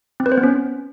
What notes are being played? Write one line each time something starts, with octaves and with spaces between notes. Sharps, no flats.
C4
B4
C5
B3
C#4